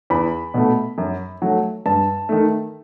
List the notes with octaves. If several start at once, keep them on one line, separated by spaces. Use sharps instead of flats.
E2 B5
B2 A3
F#2
F#3 A3
G2 A5
D#3 A3